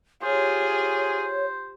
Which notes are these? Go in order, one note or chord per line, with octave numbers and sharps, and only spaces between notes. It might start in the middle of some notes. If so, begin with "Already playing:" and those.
F4 G4 G#4 C5 C#5